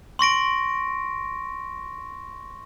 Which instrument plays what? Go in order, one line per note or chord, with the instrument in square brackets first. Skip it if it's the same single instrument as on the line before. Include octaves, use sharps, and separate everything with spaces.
[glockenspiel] C6 C#6 A#6 D7